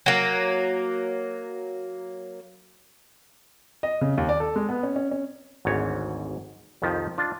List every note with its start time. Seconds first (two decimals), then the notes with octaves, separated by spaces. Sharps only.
0.06 F#3 A#3
3.83 D#5
4.01 C#3
4.18 D#2
4.29 D5
4.40 A4
4.56 G#3
4.69 B3
4.83 C#4
4.96 C#4
5.11 C#4
5.65 G#1 D2 G#2 C#5
6.82 C2 F2 D#3 F3
7.18 D4 F4